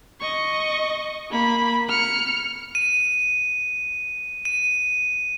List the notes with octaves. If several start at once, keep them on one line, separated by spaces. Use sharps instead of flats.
D#5 C#6
A#3 B5
F6 C#7
D#7
D#7